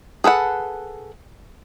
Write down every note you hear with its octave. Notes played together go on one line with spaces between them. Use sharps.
G#4 A4 B4 F#5